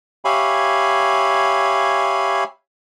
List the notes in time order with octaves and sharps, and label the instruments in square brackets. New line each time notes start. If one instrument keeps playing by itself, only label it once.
[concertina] G4 C#5 E5 F5 G#5 B5